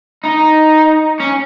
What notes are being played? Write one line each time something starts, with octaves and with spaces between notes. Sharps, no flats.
D#4
C#4